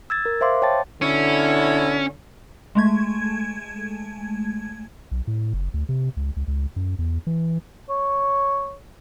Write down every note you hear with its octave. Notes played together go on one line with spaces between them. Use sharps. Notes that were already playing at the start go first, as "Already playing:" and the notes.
E6 G#6 A6
A#4
C5 E5 F5 C6 D6
C#5 G5 A5 A6
B2 D3 C#4 E4
G#3 A3 G#6
B1
A2
F#1
D2
C3
C#2
C#2
C#2
F#2
E2
E3
C#5